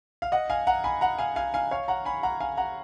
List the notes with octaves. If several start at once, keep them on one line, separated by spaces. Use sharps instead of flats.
F5
D#5 F#5
F5 G#5
F#5 A#5
G#5 B5
F#5 A#5
F5 G#5
F5 G#5
F5 G#5
C#5 F5
F#5 A#5
G#5 B5
F#5 A#5
F5 G#5
F#5 A#5